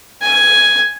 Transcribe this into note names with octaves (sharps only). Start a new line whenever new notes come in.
G#5